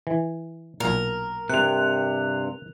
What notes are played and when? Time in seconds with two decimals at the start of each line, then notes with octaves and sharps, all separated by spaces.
0.07 E3
0.80 B1 A#2 A#4
1.50 G2 C3 F#6 F7